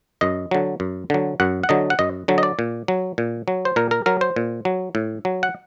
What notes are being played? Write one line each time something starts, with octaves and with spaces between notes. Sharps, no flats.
F#2 D#5
D3 F#3
F#2
D3 F#3
F#2 F#5
F#5
D3 F#3 D#5
F#5
F#2 D#5
D3 F#3
D#5
D5
A#2
F#3
A#2
F#3
C5
A#2 A#4
A#4
F#3 A#4
C5
A#2
F#3
A2
F#3
F#5